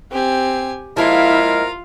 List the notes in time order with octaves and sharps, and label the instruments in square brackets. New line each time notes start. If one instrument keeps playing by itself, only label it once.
[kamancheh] C4 [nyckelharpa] G4 G#5
[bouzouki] F3 G#3 A#3 [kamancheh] E4 [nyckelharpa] F4 F5 [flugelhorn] A#4